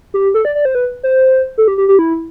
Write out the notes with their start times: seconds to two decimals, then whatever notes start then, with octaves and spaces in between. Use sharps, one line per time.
0.14 G4
0.34 A4
0.45 D5
0.55 D5
0.65 C5
0.75 B4
1.03 C5
1.58 A4
1.68 G4
1.78 G4
1.88 G4
1.99 E4